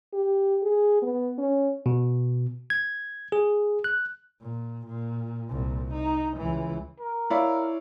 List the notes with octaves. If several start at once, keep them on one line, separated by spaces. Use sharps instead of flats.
G4
G#4
B3
C#4
B2
G#6
G#4
F#6
A#2
A#2
C2 A#2
D#4
C#2 E3
A#4
E4 C#5 D5 F5